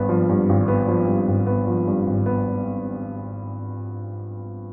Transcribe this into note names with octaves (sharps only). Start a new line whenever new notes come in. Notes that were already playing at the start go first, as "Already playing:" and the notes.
Already playing: G#1 G2 B3
F3
G2
G#1
B3
F3
G2
G#1
B3
F3
G2
G#1
B3